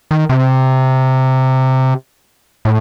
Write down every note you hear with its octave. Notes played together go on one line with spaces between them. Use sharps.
D#3
C3
A2